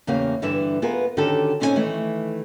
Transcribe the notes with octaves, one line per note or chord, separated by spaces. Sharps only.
E2 C#3 A#3 G4 F5
G2 D3 E3 D4 B4 E5
B3 F4 G#4 A#4 B4
D3 D#3 C#4 F#4 G4 A4
A#2 C4 C#4 D#4 B4 G#5
D#3 E3 A3